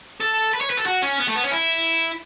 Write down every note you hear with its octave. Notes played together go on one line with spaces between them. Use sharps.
A4
B4
C#5
B4
A4
F#4
C#4
B3
A3
B3
C#4
E4